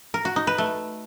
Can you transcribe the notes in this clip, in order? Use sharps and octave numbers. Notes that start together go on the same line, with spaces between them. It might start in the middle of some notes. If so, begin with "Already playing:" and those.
A#4
F#4
D#4
B4
A3